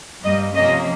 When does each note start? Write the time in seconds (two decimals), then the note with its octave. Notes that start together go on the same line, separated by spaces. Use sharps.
0.22 G2 G3 A#3 D#5
0.55 C3 F3 A#3 C#4 D#5